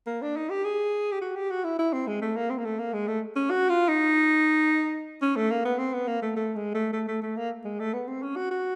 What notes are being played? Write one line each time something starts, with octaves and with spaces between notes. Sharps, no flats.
A#3
D4
D#4
G4
G#4
G4
F#4
G4
F#4
E4
E4
C4
G#3
A3
A#3
C4
A#3
A3
A#3
G#3
A3
C#4
F#4
F4
D#4
C#4
A3
A#3
B3
C4
B3
A#3
A3
A3
G#3
A3
A3
A3
A3
A#3
G#3
A3
B3
C4
C#4
F#4
F#4